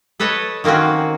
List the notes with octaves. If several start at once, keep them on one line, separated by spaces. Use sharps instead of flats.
A4 B4 C#5 D#5 A5
D#3 A#3 C4 C#4 F#4